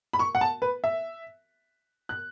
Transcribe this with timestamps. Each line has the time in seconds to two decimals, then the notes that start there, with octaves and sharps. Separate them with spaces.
0.13 B5
0.19 C#6
0.35 F#5
0.41 A5
0.62 B4
0.84 E5
2.09 F#6